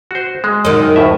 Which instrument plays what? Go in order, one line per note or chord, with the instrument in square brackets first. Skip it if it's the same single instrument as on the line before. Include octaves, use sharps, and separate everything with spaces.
[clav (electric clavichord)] F#4 C5
G#3
[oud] F#2 D#3
[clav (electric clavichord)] D2 A2 E5